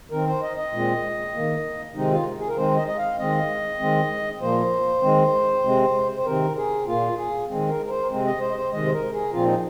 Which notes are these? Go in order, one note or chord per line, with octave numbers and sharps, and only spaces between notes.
D#3 C4 A#4
C5
D#5
D#5
A#2 G#3 C4
D#3 A#3
C3 D#3 G#3 C4 D#4
F4
G#4
A#4
D#3 G#3 C4 C5
D#5
D#5
F5
D#3 G#3 C4 D#5
D#3 G#3 C4
A#2 F3 A#3 C5
D#3 G#3 C4
C3 G#3 C4
C5
C3 D#3 C4 A#4
G#4
A#2 A#3 F4
G#4
D#3 G#3 C4
A#4
A#4
C5
C3 G#3 C4
D#5
C5
D#5
C5
C3 D#3 G#3 D#5
C5
A#4
G#4
A#2 F3 C4 F4
D#4